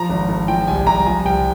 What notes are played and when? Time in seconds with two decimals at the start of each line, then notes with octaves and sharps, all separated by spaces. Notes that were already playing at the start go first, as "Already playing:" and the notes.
Already playing: F3 A#5
0.09 G#1
0.29 G#1
0.48 F3 G5
0.67 C2 G#5
0.87 C2 A#5
1.06 F3 G#5
1.25 C2 G5